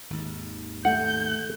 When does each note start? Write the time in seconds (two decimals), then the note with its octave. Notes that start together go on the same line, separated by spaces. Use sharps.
0.10 G#1 D#2
0.85 A3 F#5 G6